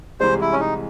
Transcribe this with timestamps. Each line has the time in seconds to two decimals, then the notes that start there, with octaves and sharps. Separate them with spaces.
0.20 C2 C3 E3 G#3 C5
0.41 E4
0.52 C#4
0.60 D#4